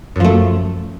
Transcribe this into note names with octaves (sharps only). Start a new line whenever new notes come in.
F#2 F3 A3